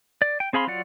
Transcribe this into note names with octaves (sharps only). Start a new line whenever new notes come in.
D5
G5
C4 G#4 F5 B5 C6
F#3 F4 D5 F#5